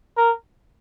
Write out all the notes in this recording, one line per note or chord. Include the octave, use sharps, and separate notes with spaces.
A#4